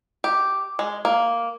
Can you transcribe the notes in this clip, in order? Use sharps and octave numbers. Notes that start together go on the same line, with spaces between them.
G4
G#3
A#3